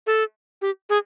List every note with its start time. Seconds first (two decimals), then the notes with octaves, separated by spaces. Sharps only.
0.07 A4
0.62 G4
0.89 G#4